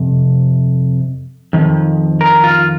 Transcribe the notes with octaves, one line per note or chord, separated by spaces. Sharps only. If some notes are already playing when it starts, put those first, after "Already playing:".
Already playing: F2 C3
F2 D#3
A#4
F4